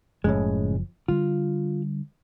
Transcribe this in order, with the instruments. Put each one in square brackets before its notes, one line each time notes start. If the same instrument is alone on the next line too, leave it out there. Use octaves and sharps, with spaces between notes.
[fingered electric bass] F#1 F3 [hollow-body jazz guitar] A2 C#3 G#3
[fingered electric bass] D3 G3 [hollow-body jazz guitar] F4